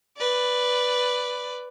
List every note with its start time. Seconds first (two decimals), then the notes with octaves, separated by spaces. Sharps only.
0.17 B4 D5